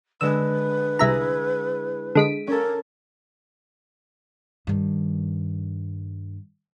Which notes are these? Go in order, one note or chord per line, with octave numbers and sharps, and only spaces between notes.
D3 G#3 B4 E6
C2 E4 G#4 E5 A#5
D3 G#3 B6 D7 D#7
C#4 A4 A#4
G2 D#3